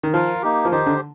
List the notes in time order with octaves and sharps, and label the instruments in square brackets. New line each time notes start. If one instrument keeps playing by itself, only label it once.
[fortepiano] D#3
[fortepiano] F3 [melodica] F4 A#4 F5
[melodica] A#3 D#4 G4
[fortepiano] F3
[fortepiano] D#3 [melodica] D#4 G4 C5
[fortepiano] D3